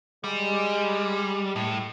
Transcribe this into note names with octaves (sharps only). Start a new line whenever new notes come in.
G3 G#3
A2